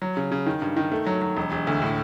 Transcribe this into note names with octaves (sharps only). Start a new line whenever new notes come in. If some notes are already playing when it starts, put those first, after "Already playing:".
F#3
C#3
C#3
D#3
G2
D#3
A3
F#3
F#3
E1
E1
D2
A2